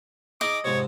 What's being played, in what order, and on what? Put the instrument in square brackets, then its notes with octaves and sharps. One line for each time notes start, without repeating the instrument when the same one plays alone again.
[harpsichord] D#4 G#4 E5 [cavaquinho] D#5 [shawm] D6
[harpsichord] F2 G#2 C3 [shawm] C#5